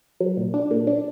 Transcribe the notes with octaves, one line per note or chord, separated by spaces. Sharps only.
F#3
A#2
D4
A#2
D4